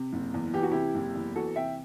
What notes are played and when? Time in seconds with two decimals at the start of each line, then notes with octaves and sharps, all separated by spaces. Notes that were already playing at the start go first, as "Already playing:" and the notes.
Already playing: C3
0.13 F#1
0.34 E2
0.54 E3 G4
0.63 F#4
0.71 C3 E4 G4
0.95 F#1
1.15 E2
1.35 E3 F#4 A4
1.56 C3 E5 G5